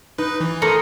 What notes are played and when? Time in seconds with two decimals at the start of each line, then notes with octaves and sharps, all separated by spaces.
0.18 D#4 B4
0.41 E3
0.62 A3 A#4 C6 D#6 C#7